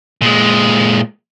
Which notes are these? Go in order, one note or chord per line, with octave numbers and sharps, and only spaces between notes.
A#2 G#3